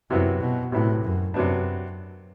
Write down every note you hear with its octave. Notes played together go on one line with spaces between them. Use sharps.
F#2 C3 F#3 B3 E4
B2
A2 C3 F#3 B3 E4
F#2
F#2 C3 F#3 B3 D4